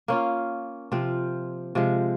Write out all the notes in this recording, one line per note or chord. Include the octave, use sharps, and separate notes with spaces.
A#3 C#4 F4
C3 F3 C4 F4
C3 F3 G#3